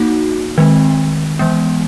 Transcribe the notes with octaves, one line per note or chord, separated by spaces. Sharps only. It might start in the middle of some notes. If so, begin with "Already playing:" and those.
Already playing: A#3 D#4 F#4
D#3 G#3 C4
E3 G#3 B3